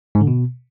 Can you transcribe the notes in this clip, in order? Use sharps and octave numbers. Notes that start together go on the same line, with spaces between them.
G#2
D3
B2